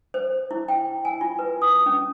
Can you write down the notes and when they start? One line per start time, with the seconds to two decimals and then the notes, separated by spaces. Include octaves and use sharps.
0.14 C5
0.51 E4
0.68 G5
1.05 G#5
1.21 F4
1.39 B4
1.62 D#6
1.86 C#4